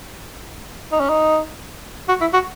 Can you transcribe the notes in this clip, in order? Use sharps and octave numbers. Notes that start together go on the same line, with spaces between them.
D#4
C#4
D#4
F#4
E4
F#4